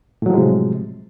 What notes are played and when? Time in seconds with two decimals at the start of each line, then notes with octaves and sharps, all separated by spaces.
0.22 A2
0.26 F#3
0.30 F3
0.34 G#3
0.38 C3